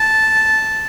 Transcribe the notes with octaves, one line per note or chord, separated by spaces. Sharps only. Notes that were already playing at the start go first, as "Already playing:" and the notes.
Already playing: A5